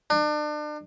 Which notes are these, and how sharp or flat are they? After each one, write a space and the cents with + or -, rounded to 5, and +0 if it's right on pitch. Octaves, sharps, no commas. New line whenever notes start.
D4 +35